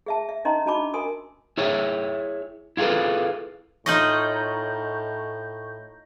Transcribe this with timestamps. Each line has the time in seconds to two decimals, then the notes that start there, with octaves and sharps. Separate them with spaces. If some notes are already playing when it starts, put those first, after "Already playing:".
0.06 G#4 E5 A5
0.29 E5
0.45 C#4 D#4 D#5 A#5 C6
0.66 D4 F#4 D#5 A5 B5 D6
0.94 A#4 G#5 C6 D#6
1.58 E4 G#4 C#5 E5
2.77 E4 F4 G#4 A4 B4
3.86 A2 D#4 F4 D#5 C#6 G6 A#6 F#7